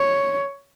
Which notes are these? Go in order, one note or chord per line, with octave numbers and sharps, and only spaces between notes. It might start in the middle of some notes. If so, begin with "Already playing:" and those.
Already playing: C#5